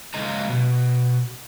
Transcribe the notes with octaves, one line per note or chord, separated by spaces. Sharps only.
C#3 G#3 D#5 A#5
B2